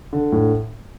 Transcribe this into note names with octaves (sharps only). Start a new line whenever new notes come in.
D3
A2